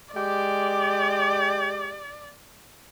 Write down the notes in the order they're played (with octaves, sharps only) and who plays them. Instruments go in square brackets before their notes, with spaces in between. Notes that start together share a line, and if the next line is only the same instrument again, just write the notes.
[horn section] G#3 G4 [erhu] D5